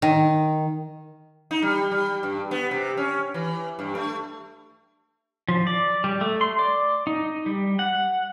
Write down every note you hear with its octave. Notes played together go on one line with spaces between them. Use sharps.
D#3
D#4
G3
G3
G2
B3
C3
C#4
E3
G2
A3
F3
D5
G3
A3
C6
D5
D#4
G3
F#5